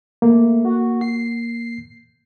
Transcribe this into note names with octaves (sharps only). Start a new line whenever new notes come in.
A3 A#3
F#4
C7